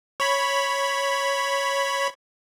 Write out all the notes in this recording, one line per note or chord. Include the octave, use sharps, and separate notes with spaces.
C#5 B5